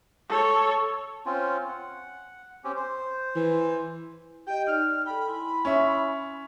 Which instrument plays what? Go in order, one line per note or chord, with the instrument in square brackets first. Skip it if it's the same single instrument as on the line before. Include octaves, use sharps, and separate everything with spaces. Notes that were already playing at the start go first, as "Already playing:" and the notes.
[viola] A4 C#5
[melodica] C4 C#4 F4
F#5
C4 C#4 G4
C5
[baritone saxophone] E3
[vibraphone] G4 D#5 [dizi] G5
[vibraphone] D#4 D5 [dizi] F6
[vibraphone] A4 G5 [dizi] B5
[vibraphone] E4 G#5 C6
[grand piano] C#4 E5